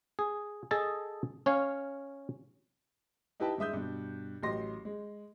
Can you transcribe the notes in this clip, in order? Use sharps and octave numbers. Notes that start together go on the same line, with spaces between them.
G#4
G#4 A4 D#5 A5
C#4 C#5 F5
D#4 E4 G4 B4 G5 A5
G2 G#3 E5 D#6 G6
G2 B2
A1 F#3 G4 D#5 C6 A#6
G#3